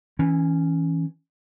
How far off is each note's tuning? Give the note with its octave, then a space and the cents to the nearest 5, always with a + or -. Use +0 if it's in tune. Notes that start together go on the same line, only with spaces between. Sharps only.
E3 -20 C#4 +0